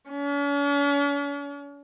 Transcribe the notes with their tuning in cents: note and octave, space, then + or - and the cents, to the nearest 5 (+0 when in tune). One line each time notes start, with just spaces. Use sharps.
C#4 +45